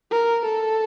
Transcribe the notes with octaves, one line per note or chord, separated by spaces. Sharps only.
A#4
A4